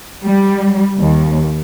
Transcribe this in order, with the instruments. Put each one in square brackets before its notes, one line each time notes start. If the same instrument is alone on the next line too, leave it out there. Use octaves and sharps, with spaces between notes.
[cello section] G3
D#2